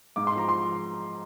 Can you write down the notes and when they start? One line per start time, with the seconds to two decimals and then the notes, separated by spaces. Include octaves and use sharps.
0.16 G#2 D6
0.27 C6
0.36 F3 A#5
0.49 C6